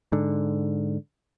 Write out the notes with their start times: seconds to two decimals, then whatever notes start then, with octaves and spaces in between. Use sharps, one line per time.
0.12 G#2 D3